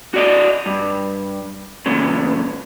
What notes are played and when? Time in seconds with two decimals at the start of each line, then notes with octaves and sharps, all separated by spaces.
0.14 F#4 D5 D#5
0.66 G2
1.86 E2 A#2 C#3